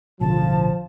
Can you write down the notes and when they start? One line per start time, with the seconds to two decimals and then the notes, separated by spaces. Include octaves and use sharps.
0.21 A1 B2 D3 F3 A5